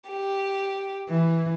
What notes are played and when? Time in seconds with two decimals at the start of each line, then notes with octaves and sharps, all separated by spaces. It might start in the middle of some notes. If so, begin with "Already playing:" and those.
0.10 G4
1.10 E3